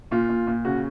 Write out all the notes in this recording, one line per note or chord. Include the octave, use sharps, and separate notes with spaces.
A#2 F4
A#2
A#2
C#3 F#4